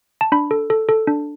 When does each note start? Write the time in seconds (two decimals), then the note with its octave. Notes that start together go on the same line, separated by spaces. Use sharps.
0.21 A5
0.32 D4 B5
0.51 A4
0.70 A4
0.89 A4
1.07 D4